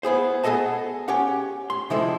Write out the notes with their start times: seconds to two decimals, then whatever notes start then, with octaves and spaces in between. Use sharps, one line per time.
0.03 B3 E4 G#4 C5
0.44 B3 G#4 A4 D#5 A5
1.08 C#4 G4 F#5
1.70 C6
1.90 C3 F3 G3 G#3 E4 A4